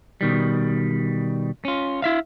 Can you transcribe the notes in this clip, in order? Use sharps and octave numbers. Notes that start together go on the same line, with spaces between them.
B2 D#3 G3
C#4 F4
E4 E5 F5